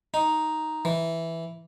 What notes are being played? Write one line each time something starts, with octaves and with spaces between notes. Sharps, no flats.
D#4
E3